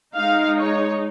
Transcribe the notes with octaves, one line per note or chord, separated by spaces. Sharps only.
G#3 D#4 F5
C#5